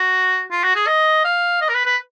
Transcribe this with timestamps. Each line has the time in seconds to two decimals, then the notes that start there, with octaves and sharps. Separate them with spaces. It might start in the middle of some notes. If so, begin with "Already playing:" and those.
Already playing: F#4
0.51 F4
0.63 F#4
0.75 G#4
0.87 D#5
1.24 F5
1.61 D#5
1.69 A#4
1.74 B4
1.85 B4